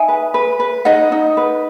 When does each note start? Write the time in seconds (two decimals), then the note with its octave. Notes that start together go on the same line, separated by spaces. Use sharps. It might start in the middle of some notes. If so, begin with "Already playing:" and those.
Already playing: D#4 E5 G#5
0.08 B4
0.34 B4
0.60 B4
0.85 D#4 D#5 F#5
1.12 D#4
1.37 B4